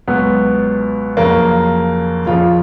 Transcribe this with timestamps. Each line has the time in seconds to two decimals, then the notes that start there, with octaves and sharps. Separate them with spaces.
0.08 C#2 B2 F#3 B3
1.17 F2 C#3 F#3 A#3
2.26 F2 C#3 F3 F4